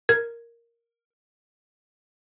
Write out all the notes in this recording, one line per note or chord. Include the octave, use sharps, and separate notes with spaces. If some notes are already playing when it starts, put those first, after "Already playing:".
A#4 G#6